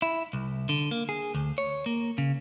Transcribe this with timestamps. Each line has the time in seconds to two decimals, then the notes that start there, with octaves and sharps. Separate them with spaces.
0.02 E4
0.33 C2
0.69 D3
0.91 A#3
1.09 G#4
1.35 D2
1.58 C#5
1.86 A#3
2.18 C#3